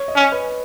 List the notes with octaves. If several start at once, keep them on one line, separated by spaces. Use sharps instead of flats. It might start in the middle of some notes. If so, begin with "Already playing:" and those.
Already playing: C#5
D#5
C#4
B4